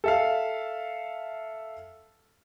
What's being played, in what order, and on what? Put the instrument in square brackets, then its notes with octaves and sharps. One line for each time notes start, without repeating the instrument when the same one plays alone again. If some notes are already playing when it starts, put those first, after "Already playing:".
[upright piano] A4 E5 F5